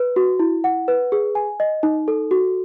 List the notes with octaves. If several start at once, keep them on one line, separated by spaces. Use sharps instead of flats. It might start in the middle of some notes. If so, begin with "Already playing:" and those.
Already playing: B4
F#4
E4
F#5
B4
G#4
G#5
D#5
D#4
A4
F#4